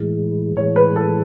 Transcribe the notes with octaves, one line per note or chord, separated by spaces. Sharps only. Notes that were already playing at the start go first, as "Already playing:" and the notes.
Already playing: A2 E3 G#3
A2 E3 G#3 C#5
B4
A4